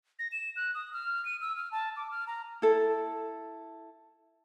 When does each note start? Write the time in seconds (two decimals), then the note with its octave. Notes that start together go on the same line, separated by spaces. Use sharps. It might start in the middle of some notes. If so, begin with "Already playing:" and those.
0.19 A#6
0.32 E7
0.56 F#6
0.75 D#6
0.93 F6
1.25 D#7
1.41 E6
1.56 F6
1.72 A5
1.96 D6
2.11 F6
2.27 A#5
2.62 E4 A4